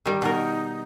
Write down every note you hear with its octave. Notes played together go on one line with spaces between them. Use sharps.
D#3 G3
B2 D#4 A#4